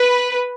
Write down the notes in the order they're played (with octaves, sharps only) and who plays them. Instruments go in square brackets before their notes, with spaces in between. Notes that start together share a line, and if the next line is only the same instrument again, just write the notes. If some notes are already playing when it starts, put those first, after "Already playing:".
Already playing: [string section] B4